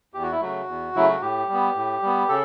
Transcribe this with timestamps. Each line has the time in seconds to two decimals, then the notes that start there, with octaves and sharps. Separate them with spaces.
0.14 E2 G4
0.23 F#4
0.32 E4
0.40 C#3 F#3 A3 F#4
0.68 E2
0.95 C#3 F#3 A3 E4
1.09 F#4
1.22 A2 G4
1.48 G3 B3
1.76 A2
2.02 G3 B3
2.29 C#3 A4